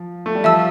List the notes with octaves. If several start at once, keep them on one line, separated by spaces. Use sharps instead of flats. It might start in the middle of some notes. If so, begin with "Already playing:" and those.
Already playing: F3
A3
G3
F3 E5 A5 E6